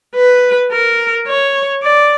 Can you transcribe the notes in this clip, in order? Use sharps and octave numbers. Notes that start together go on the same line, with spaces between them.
B4
A#4
C#5
D5